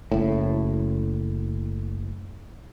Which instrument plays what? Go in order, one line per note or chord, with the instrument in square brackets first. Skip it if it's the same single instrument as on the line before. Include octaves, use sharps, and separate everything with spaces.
[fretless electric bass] F#1 A2